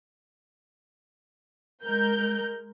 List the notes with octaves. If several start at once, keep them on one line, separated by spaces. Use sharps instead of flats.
G#3 A#4 G6